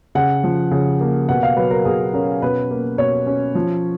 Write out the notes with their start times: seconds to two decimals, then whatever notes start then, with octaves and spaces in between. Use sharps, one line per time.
0.15 C#3 F#5
0.44 F3
0.71 C#3
1.01 A#3
1.29 B2 F#5
1.43 F5
1.57 F#3 B4
1.71 A#4
1.85 B2 G#4
2.13 C#4 A#4
2.42 B2 B4
2.71 A#3
2.98 B2 C#5
3.27 C#4
3.55 F3